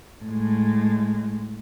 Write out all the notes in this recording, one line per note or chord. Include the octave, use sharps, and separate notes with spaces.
A2 G#3